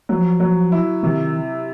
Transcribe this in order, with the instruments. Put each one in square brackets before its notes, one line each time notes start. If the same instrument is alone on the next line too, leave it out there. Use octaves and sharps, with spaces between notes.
[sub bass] F3 [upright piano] F#3
[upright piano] F#3
E4
[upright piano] C3 [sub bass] D#3